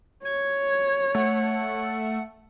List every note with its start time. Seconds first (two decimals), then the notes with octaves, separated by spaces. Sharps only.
0.24 C#5 G#6
1.15 A3 F#5